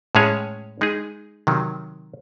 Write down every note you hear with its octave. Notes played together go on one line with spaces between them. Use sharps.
A2 G#3 C#4 G#4 C#5
G#3 D#4 G#4
C3 D#3 F#3